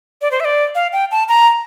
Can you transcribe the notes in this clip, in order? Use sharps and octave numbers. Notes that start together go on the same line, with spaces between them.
D5
C5
E5
D5
F5
G5
A5
A#5